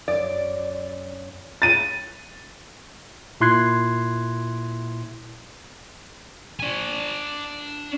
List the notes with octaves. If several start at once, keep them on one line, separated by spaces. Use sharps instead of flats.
F#2 D5
A6 D#7
A#2 E4 C6 F#6 G#6 C7
D4 G#5